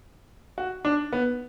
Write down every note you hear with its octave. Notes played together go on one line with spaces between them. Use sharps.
F#4
D4
B3